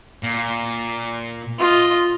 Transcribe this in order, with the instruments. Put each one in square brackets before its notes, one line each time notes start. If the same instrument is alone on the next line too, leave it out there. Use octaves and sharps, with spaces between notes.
[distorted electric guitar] A#2
[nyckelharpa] F4 D#5